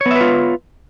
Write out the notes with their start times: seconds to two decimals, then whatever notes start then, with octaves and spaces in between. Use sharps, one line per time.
0.01 C#5
0.06 B3
0.11 E5
0.16 B4
0.21 F4